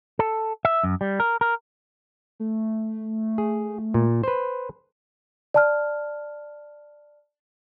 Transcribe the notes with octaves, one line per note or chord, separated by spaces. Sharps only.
A4
E5
F#2
G3
A#4
A#4
A3
G#4
A#2
B4 C5
D5 A5 F6